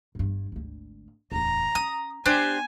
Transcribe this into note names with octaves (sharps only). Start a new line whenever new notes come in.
G1 G2
G#1 D2
D1 E2 A#5
C#4 D#6
B3 D4 G4 C5 G#5